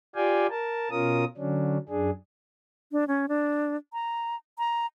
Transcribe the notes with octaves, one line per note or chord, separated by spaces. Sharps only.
F4 G4 D5 F5 G5 G#5
A#4 A5
B2 C#4 F4 A#4 D#6
D3 F#3 C#4 D4
F#2 D4 G#4
D4
C#4
D4
A#5
A#5